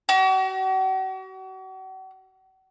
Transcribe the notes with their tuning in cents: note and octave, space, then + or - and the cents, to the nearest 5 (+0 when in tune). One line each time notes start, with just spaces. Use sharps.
F#4 +40